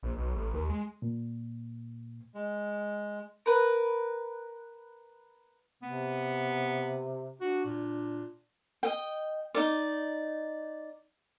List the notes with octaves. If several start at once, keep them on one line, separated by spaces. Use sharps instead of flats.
A#1
B1
A1
D#2
G#3
A#2
G#3
A#4 B4
C3 B3
D4 F#4
A#2
D#5 G5
D#4 D5